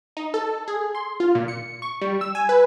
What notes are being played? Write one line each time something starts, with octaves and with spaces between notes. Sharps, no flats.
D#4
A4
G#4
C6
F4
A#2
C#7
C#6
G3
E6
G#5
B4